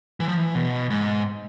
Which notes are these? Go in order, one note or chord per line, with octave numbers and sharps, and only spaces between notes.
E3
F3
E3
B2
G#2